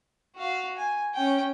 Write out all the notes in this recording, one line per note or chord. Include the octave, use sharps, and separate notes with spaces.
F#4 F5
G#5
C#4 G5